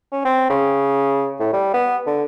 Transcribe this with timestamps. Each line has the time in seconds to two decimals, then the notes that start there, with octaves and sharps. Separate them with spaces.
0.12 C#4
0.25 C4
0.50 C#3
1.40 A2
1.53 G3
1.74 B3
2.06 D3